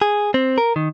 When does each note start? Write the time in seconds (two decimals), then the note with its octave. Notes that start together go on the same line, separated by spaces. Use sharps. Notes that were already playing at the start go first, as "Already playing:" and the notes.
0.02 G#4
0.34 C4
0.58 A#4
0.76 D#3